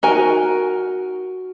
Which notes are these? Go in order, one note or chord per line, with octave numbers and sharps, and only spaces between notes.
D#4 F#4 A#4 G#5